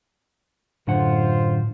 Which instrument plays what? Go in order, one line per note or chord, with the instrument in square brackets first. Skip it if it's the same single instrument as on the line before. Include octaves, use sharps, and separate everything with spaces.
[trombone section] A1 F4 C5 [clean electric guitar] F#2 D3 F#5 [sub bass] A2